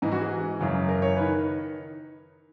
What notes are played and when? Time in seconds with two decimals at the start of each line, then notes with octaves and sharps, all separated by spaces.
0.02 G#2 E3 D#4
0.12 F#4
0.22 G#4
0.59 F#2 C#3 E3
0.89 A#4
1.02 C#5
1.17 D#3 B4